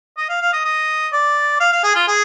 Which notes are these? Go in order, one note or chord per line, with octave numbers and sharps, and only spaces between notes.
D#5
F5
F5
D#5
D#5
D5
F5
F5
G#4
F4
G#4